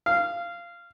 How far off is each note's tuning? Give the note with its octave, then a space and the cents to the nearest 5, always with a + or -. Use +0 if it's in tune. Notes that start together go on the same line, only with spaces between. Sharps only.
F5 -15